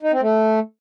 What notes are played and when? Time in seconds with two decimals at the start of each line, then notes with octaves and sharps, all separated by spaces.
0.02 D#4
0.12 C4
0.22 A3